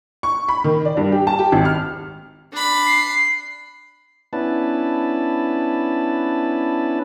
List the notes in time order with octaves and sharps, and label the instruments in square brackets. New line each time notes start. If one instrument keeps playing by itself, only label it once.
[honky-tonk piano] C#6
B5
D#3
D5
G2
G4
A5
G4
G#1
F6
[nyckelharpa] D4 B5
[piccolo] C7
[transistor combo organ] B3 C#4 D4 E4 B4 A5